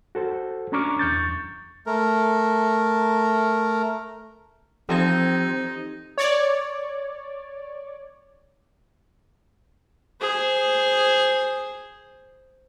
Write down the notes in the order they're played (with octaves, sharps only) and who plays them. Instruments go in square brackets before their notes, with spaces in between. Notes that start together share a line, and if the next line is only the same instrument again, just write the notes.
[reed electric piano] F#4 A4 C5
C#4 D4 A#5 C#6 D6 F6
E2 C#6 G6 A6
[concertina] A3 A#4
[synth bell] E3 G4 G#6 [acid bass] F3 [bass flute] C4 [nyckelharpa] D#4
[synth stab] C#5 D5
[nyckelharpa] G#4 C5